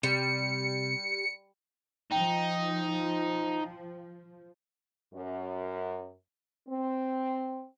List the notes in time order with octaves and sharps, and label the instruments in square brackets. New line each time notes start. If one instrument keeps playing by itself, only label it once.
[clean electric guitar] C3 [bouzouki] G3 [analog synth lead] C#7
[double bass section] F3 [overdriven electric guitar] D#4 [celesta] G5
[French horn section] F#2
C4